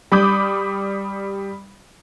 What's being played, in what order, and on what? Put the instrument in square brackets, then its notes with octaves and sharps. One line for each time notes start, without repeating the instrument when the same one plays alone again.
[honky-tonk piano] G3 B5 D6 D#6 G6